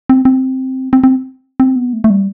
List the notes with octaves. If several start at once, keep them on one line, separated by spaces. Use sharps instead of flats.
C4
C4
C4
C4
C4
B3
A3
A3
G3